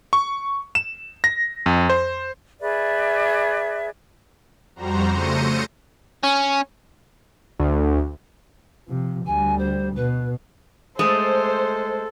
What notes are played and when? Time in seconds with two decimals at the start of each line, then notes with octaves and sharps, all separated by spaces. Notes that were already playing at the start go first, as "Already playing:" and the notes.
0.13 C#6
0.75 E7
1.24 A#6
1.66 F2
1.89 C5
2.60 G#4 B4 D5 E5
4.76 F2 G3 F#4 C5 A#5
5.08 C#3 A3 C5 A#6 C#7 D#7
6.23 C#4
7.59 D2
8.87 C3 F3
9.26 D2 G3 G#5
9.58 C5
9.96 B2 B4
10.99 G#3 A3 A4 C5